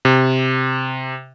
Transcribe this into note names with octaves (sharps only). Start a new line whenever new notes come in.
C3